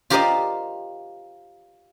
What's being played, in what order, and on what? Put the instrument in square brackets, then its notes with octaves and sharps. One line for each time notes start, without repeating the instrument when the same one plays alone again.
[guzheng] F4 G4 A#4 C5 D5 D#5